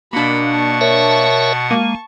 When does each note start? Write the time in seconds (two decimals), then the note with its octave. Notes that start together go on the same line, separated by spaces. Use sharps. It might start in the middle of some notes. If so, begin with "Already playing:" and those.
0.13 B2 A#3 D4 F#5 B5
0.50 A5 C#6
0.81 A#4 C#5 E5
1.71 G#3 A#3